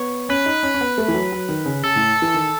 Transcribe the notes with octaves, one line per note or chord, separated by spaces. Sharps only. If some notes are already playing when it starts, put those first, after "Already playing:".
Already playing: B3 C#5
C#4 B4
D#4
C#4
C#4
B3
A3
E3
F#3
F#3
D#3
C#3
C#3 A4
A2
E3
D#3